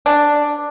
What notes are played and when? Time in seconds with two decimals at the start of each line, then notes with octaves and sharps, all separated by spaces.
0.06 D4